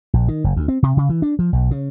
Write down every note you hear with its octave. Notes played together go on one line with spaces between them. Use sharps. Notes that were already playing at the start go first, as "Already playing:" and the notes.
A#1
D#3
F#1
D2
C4
C3
C#3
E3
D4
F3
B1
C#3